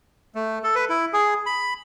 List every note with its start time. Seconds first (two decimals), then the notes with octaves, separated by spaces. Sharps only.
0.35 A3
0.64 A4
0.75 B4
0.90 E4
1.13 G#4
1.46 B5